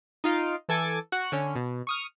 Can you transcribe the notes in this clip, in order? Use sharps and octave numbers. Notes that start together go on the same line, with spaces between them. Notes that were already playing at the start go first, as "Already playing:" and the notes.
D#4 F4 F5 D7
E3 A4 G#5 D6 A6
F#4 F#5
D3 C#4
B2
C#6 D#6 F6